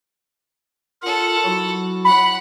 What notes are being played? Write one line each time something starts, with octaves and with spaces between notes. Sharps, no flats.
F4 A4 A#4 F#5
F#3 E4 F#4
F#5 B5 F#6